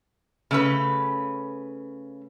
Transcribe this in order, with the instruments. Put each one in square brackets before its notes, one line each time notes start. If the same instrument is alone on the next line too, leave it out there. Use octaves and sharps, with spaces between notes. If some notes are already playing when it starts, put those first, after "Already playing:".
[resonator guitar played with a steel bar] C#3 A3 B4